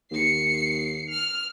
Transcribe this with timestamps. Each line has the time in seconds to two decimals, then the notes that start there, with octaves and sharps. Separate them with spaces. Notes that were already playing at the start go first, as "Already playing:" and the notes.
0.11 D#2 C7 C#7
1.09 F6